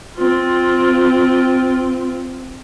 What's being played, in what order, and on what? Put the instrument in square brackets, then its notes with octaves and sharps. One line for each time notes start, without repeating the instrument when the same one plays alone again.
[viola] C4 F4